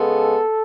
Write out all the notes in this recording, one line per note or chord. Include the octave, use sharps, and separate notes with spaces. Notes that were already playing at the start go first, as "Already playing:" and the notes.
Already playing: C#3 G#3 B3 A4